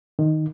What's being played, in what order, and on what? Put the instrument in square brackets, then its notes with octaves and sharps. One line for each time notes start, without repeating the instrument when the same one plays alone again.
[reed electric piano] D#3